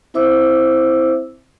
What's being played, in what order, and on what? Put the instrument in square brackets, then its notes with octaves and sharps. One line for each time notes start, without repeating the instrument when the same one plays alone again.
[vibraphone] C4 E4 C5 E5 D6 E6